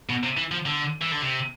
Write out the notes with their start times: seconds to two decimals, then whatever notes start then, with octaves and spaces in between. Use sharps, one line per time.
0.09 B2
0.24 C3
0.37 E3
0.51 F3
0.66 D3
1.01 E3
1.12 D3
1.22 C3